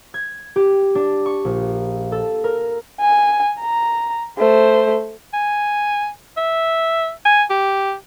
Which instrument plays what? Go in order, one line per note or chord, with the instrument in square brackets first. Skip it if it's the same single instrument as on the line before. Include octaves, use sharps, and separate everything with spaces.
[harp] G#6
G4
D4
C#6
A#1
A4
A#4
[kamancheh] G#5
A#5
A3 C5
[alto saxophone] G#5
E5
G#5
G4